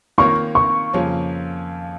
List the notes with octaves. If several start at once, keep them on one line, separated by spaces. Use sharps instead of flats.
D#3 A#3 F4 A#4 C#5 C#6
C#6
F2 C#3 F3 A#3 C#4